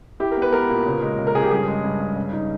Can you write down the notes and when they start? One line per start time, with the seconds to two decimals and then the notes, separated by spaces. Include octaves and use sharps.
0.20 E4 G4
0.31 A#4
0.37 B3
0.42 B4
0.52 B3 A#4
0.69 A#2
0.86 C#3
1.02 G#3
1.19 C#3
1.27 A#4
1.35 C#3 G#4
1.43 G4
1.51 G2 G#4
1.68 G#3
1.84 G2
2.01 G2
2.16 C#3
2.33 D#4